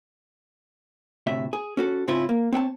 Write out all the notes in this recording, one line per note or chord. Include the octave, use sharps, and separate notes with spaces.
D2 A2 C3 E5
G#4
C#4 F#4 A4
G#2 C#3 C4 C#4 E4 F4
A#3
C4 C#5 F#5 A5